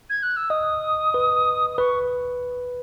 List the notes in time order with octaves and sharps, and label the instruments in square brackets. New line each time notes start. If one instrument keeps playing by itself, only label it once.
[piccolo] G#6
F#6
E6
[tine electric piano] D#5 [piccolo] D#6
[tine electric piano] B4
[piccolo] D#6
[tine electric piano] B4 [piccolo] C#6